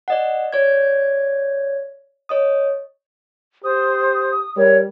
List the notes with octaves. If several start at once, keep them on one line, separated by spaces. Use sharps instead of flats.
D5 D#5 F#5
C#5 D5 G#6
C#5 D#5 D#6
G4 C5 D#6
G3 A#4 C#5